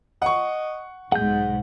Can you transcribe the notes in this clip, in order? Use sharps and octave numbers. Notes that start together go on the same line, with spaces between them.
D#5 F#5 C#6
B1 G#2 G#4 F#5 G6